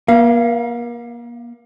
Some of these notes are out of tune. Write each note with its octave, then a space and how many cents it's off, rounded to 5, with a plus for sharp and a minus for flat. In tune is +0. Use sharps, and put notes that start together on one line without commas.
A#3 +35 F5 -25